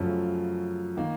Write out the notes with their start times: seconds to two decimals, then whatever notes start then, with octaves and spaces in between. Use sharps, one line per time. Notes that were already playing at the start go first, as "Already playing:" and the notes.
Already playing: F#2 C#3 F3 A3 C#4
0.97 D#3 A#3